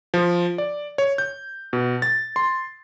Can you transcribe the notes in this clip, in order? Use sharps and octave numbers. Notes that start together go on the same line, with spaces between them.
F3
D5
C#5
G6
B2
A6
C6